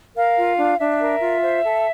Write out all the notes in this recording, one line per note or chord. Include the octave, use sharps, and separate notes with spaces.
A#4 F5
F4
D4
D4 E5
A#4
F4
C5
A4